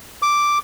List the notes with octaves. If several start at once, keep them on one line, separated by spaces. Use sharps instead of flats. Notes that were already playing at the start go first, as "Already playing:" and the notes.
D6